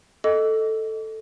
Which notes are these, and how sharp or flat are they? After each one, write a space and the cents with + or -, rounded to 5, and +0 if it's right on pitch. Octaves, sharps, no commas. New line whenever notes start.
A4 +0 D#5 +0 D6 -35